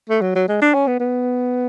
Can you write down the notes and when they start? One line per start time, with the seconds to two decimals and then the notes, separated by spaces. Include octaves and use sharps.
0.09 A3
0.21 F#3
0.36 F#3
0.48 G#3
0.62 D4
0.74 C#4
0.87 B3
1.00 B3